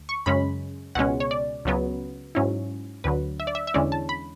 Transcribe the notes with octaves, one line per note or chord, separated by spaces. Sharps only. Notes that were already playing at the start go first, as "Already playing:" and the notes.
Already playing: D2
C#6
F#2 C#3 G#3 C#4 B5
C#2 B2 G#3 C#4 F#5
C#5
D5
C#2 C#3 F#3 B3
G#2 F#3 C#4 E4
D2 D3 F#3 B4
E5
D5
E5
E5
E2 D3 G#3 C#4 E4 D5
A5
B5